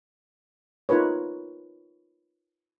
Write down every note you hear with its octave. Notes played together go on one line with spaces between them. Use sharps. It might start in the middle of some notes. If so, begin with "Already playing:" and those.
D#4 F4 A#4 B4 C#5